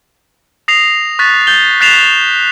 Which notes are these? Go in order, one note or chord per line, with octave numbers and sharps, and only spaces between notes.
D#6 A#6 C7 F7
C#6 F#6 A6 B6
G6 A6 G7
F#6 A6 B6 C7 E7 F7